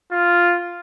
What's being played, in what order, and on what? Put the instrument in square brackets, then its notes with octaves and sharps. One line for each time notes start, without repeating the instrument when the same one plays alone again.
[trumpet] F4